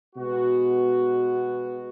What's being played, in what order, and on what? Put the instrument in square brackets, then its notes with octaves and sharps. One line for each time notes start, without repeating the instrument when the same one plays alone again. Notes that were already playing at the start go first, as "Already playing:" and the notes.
[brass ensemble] B2 G#3 B3 F#4